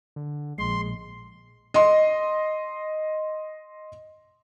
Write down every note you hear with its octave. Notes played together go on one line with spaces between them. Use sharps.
D3
A#1 G#3 C6
D#5 C6